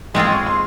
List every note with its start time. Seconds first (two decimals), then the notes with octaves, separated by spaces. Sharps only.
0.14 G#3 C4 F4 G#4 C6
0.24 C6
0.31 C#6
0.47 C6